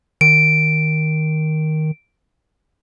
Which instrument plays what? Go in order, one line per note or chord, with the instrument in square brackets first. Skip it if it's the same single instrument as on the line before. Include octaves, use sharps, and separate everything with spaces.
[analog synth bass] D#3 [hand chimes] D7